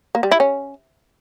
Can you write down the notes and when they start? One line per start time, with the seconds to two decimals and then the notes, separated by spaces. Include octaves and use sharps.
0.15 A#3
0.23 G3
0.31 E4
0.40 C#4